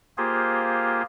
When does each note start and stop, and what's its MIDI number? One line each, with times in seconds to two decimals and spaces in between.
0.18 1.02 58
0.18 1.02 65
0.18 1.02 67
0.18 1.02 68
0.18 1.02 72